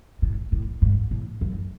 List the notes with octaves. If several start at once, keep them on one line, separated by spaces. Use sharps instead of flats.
A2
A2
G#2
A2
F#2